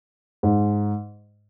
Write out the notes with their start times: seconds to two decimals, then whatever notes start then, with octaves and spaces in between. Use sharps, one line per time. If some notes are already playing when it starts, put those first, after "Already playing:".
0.43 G#2